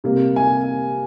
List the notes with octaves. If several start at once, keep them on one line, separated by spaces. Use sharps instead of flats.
C3 G3 A#3
G#5